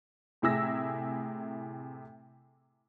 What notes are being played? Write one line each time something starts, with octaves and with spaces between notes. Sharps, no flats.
A2 C3 E4 G#4 E6 A#6